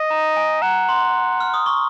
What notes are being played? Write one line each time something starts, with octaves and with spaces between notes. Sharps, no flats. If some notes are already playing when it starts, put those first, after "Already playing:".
Already playing: D#5
A#5
G#5
F#5 A#5
C6
F6
D#6
C#6